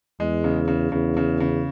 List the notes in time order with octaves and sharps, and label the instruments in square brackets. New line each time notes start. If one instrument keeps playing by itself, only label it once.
[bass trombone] E2 [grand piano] G#3
[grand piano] C#3
C#3
[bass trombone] E2 [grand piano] C#3
[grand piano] C#3
C#3